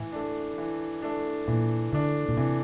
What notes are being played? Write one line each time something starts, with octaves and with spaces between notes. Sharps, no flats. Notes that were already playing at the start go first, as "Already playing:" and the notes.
Already playing: A2 E3
A3 D4
E3
A3 D4
A#2 E3
D3 A3 D4
A#2
C3 E3